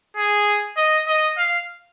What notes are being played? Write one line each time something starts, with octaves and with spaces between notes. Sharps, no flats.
G#4
D#5
D#5
F5